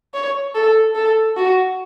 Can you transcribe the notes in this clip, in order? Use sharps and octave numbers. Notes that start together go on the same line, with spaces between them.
C#5
A4
A4
F#4